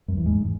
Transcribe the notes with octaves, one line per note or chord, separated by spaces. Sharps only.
F#2
E2
G#2